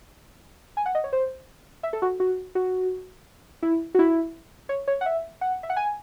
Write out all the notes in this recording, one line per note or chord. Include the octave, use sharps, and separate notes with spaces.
G#5
F#5
D#5
C#5
C5
E5
A4
F#4
F#4
F#4
E4
F#4
E4
C#5
C#5
F#5
E5
F#5
E5
F#5
G#5